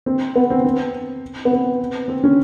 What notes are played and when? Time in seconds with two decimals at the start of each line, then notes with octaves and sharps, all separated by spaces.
0.06 C4
0.36 B3
0.50 C4
0.65 C4
1.45 B3
1.51 C4
2.08 C4
2.24 C#4